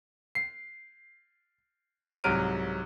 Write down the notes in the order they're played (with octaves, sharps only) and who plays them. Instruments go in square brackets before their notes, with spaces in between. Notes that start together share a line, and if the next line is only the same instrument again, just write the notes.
[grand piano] C7
C2 G#2 F#3 F6 D7 D#7